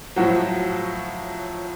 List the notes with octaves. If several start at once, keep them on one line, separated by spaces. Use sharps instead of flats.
A2 F3 F#3 F#4